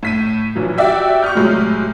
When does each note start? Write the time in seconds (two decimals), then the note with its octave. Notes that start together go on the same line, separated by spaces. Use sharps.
0.03 A2 B6 D#7
0.55 A#1 E3 F#3
0.78 F#4 G4 D5 E5 G5
1.22 C#6 D#6 F6 G6
1.35 A2 C3 F#3 G#3 A3